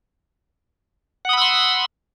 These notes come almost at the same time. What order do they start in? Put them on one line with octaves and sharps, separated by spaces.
F#5 D#6 B5 E6 C6